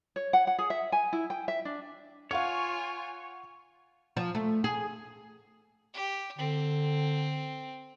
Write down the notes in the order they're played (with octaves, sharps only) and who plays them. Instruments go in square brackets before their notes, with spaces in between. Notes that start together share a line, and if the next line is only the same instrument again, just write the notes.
[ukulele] C#5
F#5
F#5
G#4
E5
G#5
E4
G5
E5
D4
[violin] F4 G#5 [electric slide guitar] C#5 [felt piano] F5 F#5 C#6
[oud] F3
A3
G#4
[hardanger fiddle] G4
[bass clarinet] D3 [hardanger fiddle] C4